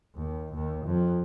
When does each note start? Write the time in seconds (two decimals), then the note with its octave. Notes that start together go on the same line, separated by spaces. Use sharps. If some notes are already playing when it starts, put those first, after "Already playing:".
0.16 D#2
0.54 D#2
0.85 F2